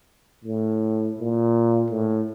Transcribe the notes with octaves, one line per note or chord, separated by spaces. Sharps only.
A2
A#2
A2